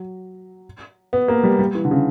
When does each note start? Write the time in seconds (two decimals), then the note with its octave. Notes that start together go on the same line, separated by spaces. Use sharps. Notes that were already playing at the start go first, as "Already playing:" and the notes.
Already playing: F#3
1.13 B3
1.28 A#3
1.43 G3
1.59 G3
1.75 E3
1.85 D3
1.91 C#3